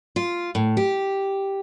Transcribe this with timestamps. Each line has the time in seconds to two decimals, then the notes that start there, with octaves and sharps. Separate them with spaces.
0.16 F4
0.55 A2
0.77 G4